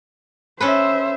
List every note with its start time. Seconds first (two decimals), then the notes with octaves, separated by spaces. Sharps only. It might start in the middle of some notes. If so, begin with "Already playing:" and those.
0.61 C#4 A4 B4 C5 E5